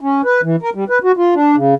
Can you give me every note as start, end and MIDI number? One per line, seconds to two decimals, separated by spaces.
0.01 0.22 61
0.25 0.41 71
0.43 0.56 52
0.62 0.70 70
0.75 0.84 55
0.90 0.99 71
1.04 1.12 66
1.17 1.34 65
1.35 1.56 62
1.56 1.75 49